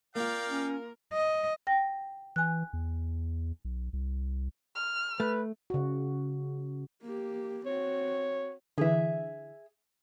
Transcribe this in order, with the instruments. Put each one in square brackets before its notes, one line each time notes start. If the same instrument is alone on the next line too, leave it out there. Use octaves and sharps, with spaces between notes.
[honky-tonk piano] A#3 F4 [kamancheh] A#4 [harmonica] D5 F5 G5
[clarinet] C#4
[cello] D#5
[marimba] G5 A#6
[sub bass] E3 [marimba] G#5 F#6
[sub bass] E2
B1
C2
[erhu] F6
[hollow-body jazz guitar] A3 [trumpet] B4
[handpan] C#3 F#4
[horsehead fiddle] A#3 G4
[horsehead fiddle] C4 F#4 [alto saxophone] C#5
[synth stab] D3 E3 [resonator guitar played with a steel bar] G#4 E5